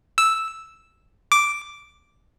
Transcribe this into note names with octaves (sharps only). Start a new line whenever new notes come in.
E6
D6